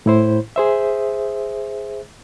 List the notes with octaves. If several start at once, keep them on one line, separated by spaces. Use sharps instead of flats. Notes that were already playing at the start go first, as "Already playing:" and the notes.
A2 E4 C5
G#4 C5 E5